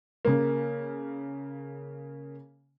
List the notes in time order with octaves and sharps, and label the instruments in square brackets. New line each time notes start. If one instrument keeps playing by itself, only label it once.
[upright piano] C#3 A#3